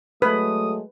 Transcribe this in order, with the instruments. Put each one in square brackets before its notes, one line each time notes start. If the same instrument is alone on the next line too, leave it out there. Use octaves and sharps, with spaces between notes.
[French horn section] F#3 G#3 A3 [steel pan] B4 [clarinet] D#6